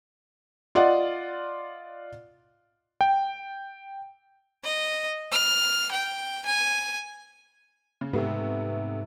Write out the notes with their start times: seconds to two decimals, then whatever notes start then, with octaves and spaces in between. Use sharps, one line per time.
0.75 F4 D5 D#5 F#5
3.01 G5
4.64 D#5
5.32 F6
5.91 G5
6.45 G#5
8.01 C#3
8.13 G#2 C3 A3 B3